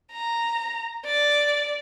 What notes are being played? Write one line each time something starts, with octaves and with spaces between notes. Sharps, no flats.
A#5
D5